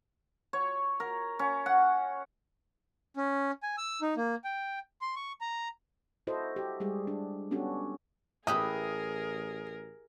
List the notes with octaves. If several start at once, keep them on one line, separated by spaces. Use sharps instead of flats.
C#5
A#4
C#4
F#5
C#4
G#5
E6
D#4
A#3
G5
C6
C#6
A#5
E4 F#4 A4 C5 D#5
F#4 G4
G3 G#3 G4 G#4
D4
B3 C#4 D4 F#4 G4 A4
A1 E4 G4 G#4 A#4 B4 D#6